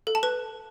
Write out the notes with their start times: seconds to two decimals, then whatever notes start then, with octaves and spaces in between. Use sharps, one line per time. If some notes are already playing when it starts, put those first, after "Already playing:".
0.07 A4
0.15 A5
0.23 B4